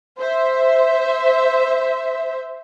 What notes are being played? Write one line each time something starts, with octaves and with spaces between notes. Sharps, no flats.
C5 E5